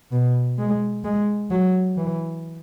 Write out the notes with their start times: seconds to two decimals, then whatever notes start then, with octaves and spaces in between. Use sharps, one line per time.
0.12 B2
0.58 G#3
1.04 G#3
1.51 F#3
1.97 E3